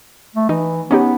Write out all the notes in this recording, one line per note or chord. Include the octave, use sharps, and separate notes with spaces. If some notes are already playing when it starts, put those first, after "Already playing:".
A3
E3 D#4
B3 C#4 D#4 G4